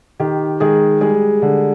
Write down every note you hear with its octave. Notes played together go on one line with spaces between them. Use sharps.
D#3 G4
D#3 G#3 G#4
G3 G#3 G#4
D3